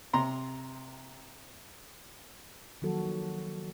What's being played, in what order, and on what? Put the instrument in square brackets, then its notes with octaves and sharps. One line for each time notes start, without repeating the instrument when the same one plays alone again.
[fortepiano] C3 A#5 C6
[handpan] D#3 F3 F#3 A#3 F#4 A4